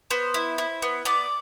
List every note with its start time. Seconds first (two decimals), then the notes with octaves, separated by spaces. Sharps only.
0.11 B3 C5
0.34 E4
0.58 E4
0.82 B3
1.05 B3 D5